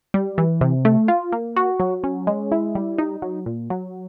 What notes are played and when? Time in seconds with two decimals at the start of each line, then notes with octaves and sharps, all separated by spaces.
0.14 G3
0.38 E3
0.61 C3
0.85 A3
1.08 F4
1.32 A#3
1.56 F#4
1.80 F#3
2.04 C#4
2.27 G#3
2.52 E4
2.75 G3
2.98 D#4
3.22 F#3
3.46 A#2
3.70 F#3